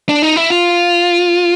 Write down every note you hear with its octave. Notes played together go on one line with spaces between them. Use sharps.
D4
D#4
E4
F4